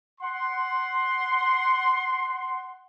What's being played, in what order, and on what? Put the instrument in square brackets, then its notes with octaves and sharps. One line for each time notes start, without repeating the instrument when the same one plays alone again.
[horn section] F#5 C6